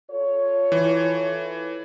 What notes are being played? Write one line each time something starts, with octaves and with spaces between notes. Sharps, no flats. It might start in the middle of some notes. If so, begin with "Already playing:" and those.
F4 A4 C#5
E3